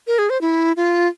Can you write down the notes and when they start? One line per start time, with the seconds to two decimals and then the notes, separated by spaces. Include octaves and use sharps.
0.07 A#4
0.19 G#4
0.30 C5
0.41 E4
0.77 F4